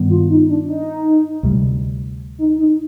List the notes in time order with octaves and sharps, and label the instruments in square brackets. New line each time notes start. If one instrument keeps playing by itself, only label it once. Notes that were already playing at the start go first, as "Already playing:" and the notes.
Already playing: [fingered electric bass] G2 D#3 G3 B3
[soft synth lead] F4
D#4
D4
D#4
[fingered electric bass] D2 C3 G3
[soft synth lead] D#4
D#4